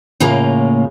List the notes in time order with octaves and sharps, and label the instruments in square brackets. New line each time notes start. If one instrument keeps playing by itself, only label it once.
[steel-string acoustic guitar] A2 C#3 A#3 F4